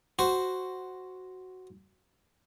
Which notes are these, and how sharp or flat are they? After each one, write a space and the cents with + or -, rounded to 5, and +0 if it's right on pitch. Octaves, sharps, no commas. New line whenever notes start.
F#4 +5 C5 -5